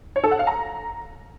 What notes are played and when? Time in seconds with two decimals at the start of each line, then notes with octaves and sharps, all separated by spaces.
0.16 C#5
0.24 A4
0.31 F#5
0.39 F5
0.47 A#5